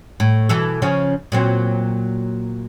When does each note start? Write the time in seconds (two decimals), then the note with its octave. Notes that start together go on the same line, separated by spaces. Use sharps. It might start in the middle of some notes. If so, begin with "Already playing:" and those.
0.20 A2
0.49 B2 E3 A4
0.82 C#3 F3 C#4
1.32 A#2 F#3 C4